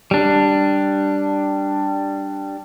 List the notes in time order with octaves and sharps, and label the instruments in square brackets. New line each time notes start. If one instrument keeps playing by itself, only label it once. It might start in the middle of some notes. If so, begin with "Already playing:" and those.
[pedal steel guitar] G3 D4